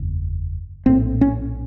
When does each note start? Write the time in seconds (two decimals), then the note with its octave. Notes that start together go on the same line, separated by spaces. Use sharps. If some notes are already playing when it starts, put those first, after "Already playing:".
Already playing: F#1 E2
0.86 A#1 A2 C4
1.21 C#4